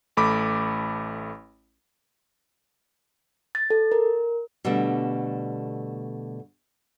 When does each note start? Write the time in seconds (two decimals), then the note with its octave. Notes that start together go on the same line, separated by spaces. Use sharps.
0.17 A1 A3 B5 D6
3.55 A6
3.70 A4
3.92 A#4
4.65 B2 D3 G3 A3